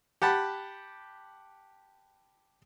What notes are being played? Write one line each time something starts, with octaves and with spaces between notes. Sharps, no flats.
G4 F#5 A5 B5